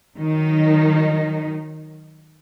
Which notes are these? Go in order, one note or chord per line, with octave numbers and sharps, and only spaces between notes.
D#3 F#3 D#4